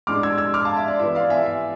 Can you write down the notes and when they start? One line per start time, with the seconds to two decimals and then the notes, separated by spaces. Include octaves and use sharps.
0.07 A2 G#3 D4 D6 F6
0.23 E6 G#6
0.38 E6 G#6
0.54 D6 F6
0.65 F5 A5
0.77 E5
0.88 D5
0.99 E3 B3 E4 E5
1.15 D5 F5
1.30 E5 G#5
1.46 E5